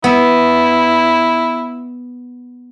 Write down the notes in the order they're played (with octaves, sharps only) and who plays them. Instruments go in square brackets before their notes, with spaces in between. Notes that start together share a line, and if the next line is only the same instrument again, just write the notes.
[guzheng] B3 [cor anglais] E4